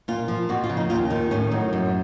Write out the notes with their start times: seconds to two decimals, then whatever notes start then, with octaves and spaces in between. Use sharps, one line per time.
0.08 A#2 F4
0.28 F3
0.49 F2 F#4
0.64 F4
0.69 C#3
0.77 D#4
0.90 D#2 F4
1.10 D#3
1.31 A2 C#4
1.51 F#3 D#4
1.73 F#2